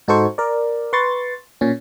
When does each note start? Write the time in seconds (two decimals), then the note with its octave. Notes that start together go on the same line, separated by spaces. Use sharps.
0.08 G#2 D#4 F#4 A4 C5 C#6
0.38 A#4 D5
0.93 B4 C6 C#6 A6
1.61 A#2 C#4